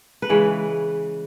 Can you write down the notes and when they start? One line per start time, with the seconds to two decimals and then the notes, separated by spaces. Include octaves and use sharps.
0.22 B4
0.29 C#3 E3 G#3 C#5